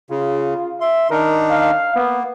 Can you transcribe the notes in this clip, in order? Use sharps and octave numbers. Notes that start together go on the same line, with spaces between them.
C#3 F4
E5 C6
D#3 D4 D#4 A#4
F5
A#3 B3